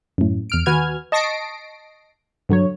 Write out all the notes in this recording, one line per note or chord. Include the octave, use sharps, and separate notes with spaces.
F#2 A2
E2 F6 D7
D#2 F#4 B4 G#5 F6 G#6
D#5 A5 C#6 A#6 C7 D7
G2 D3 F#3 C#5